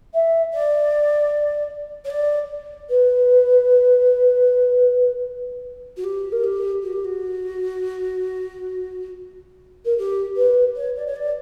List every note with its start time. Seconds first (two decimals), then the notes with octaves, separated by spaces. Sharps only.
0.14 E5
0.52 D5
2.04 C#5
2.10 D5
2.90 B4
5.96 F#4
6.04 G4
6.32 A#4
6.43 G4
6.82 F#4
6.92 G4
7.04 F#4
9.85 A#4
9.98 G4
10.36 B4
10.76 C#5
10.96 D5
11.06 C#5
11.16 D5